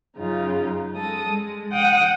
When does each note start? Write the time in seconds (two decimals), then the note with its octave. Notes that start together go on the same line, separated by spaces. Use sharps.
0.18 F#2 C#3 D#4 F4
0.94 G#3 A4 D#6
1.26 G#3
1.71 F#5 G5 D#6